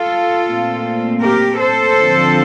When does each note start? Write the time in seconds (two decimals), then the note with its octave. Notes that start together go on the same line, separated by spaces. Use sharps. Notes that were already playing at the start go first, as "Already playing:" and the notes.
Already playing: F4 A4
0.46 A#2 A3 C4
1.22 G4 A#4
1.59 A4 C5
1.96 D3 F3 C4